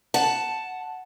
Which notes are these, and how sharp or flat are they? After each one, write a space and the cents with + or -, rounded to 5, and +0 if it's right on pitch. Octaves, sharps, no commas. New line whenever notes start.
F#5 +0 A5 +0